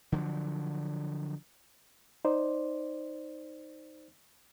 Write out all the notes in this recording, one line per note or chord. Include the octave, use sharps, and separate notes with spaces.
D3 F3 F#3
D#4 C5 D5